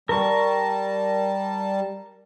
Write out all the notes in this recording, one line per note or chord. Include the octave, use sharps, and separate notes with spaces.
G3 A#4 A5 C#6